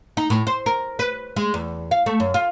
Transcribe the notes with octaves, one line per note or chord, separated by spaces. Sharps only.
D#4
A2
C5
A#4
B4
G#3
E2
F5
A3
F#2
F4